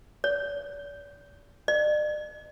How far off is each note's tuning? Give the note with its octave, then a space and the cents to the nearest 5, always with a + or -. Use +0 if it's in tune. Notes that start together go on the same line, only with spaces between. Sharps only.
D5 -40
D5 +45